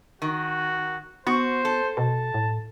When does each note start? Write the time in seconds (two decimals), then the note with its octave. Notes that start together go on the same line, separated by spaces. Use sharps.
0.22 D#3 F#4
1.27 B3 F#4 C5
1.65 A4
1.97 B2 A5
2.34 A2